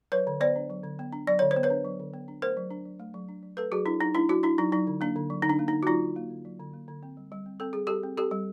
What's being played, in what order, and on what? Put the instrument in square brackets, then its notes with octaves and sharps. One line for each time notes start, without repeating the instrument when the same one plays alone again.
[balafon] F#3 B4 C#5
D3
B3 C5 D5
D4
F#3
D3
B3
D4
F#3 D5
D3 C#5
C5
B3
B4 C#5
D4
F#3
D3
B3
D4
A3 A#4 C5
F#3
D4
F#3
A3
F#3
D4
F#3
A3 A4 B4
F#3 F#4 G#4
D4 E4
F#3 D#4
A3 D4 E4
F#3 E4 F#4
D4 E4
F#3 D#4
F#3 D#4
D3
A#3 D4
D3
F#3
D3 D#4
D4
A#3
D#4
D3
F#4
F#3 D#4 F4
D3
A#3
D3
F#3
D3
A#3
D3
C4
G3
G3
C4
C4 A4
G3 G#4
G3 G4 A4
C4
C4 G4 A4
G3